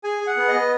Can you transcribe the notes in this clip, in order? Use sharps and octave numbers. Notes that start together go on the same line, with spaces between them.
G#4 G#5
G#4
F#5
B3
D#5
B3